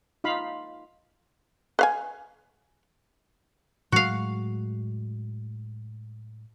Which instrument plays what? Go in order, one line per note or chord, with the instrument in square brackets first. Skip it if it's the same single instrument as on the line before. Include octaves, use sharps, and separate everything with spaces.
[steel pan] D#4 F4 F5 B5
[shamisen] B4 F5 G#5
[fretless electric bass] A2 F#3 G#3 [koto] F#4 F5